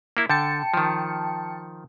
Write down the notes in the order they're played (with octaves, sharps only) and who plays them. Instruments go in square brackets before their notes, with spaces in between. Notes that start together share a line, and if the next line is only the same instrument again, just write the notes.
[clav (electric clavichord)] A#3 E4
[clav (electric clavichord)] D3 [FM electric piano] G5 A5 C#7
[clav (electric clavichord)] D#3 F3